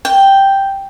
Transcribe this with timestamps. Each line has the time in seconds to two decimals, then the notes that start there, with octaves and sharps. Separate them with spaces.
0.05 G5